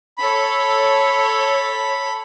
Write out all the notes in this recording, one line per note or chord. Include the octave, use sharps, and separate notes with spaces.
A4 C#5 B5